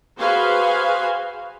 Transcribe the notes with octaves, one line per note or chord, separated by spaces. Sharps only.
F#4 G#4 B4 C5 F5 G#5